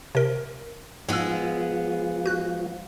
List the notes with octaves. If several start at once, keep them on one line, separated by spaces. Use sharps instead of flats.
C3 A#4
G#2 F3 G#3 B3 G#4 E6
F#4 F#6